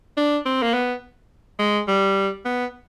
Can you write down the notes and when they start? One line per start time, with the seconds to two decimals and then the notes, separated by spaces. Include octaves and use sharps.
0.17 D4
0.46 C4
0.63 A#3
0.74 B3
1.59 G#3
1.88 G3
2.45 B3